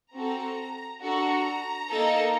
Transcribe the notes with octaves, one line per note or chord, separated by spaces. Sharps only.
C4 F#4 A4 A#5
D4 F#4 A4 A#5
A#3 D#4 A4